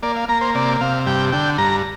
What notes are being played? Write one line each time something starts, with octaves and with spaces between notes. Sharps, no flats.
A#3 D5
F5
A#3 A#5
C5
C3 D5
C3 F5
G2 G5
D3 G5
G2 A#5